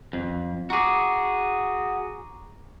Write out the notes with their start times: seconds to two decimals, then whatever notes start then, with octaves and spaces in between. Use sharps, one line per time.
0.13 F2
0.70 F#4 G#4 A#5 C#6 D6